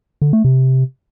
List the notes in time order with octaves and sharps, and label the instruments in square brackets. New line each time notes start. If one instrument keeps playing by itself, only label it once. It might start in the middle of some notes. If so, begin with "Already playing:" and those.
[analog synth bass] D3
A3
C3